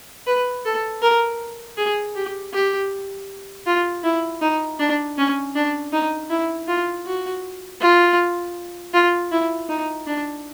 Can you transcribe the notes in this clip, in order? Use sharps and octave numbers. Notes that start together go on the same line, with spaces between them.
B4
A4
A#4
G#4
G4
G4
F4
E4
D#4
D4
C#4
D4
D#4
E4
F4
F#4
F4
F4
E4
D#4
D4